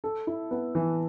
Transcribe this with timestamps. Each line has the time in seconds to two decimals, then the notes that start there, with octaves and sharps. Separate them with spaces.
0.04 A4
0.27 E4
0.51 B3
0.75 E3